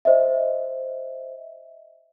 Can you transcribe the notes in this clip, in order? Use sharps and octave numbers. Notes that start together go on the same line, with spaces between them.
C5 D#5 E5